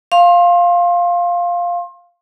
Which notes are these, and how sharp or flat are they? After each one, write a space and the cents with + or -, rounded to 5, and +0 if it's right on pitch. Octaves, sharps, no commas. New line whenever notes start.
F5 +0 C6 +30